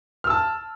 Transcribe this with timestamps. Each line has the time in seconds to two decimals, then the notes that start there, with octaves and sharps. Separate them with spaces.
0.24 F6
0.27 E6
0.30 A5